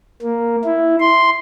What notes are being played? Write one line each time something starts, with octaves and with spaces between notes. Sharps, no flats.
A#3
E4
C6